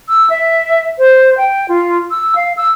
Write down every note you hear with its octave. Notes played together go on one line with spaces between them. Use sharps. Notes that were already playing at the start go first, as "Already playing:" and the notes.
E6
E5
C5
G5
F4
E6
F5
E6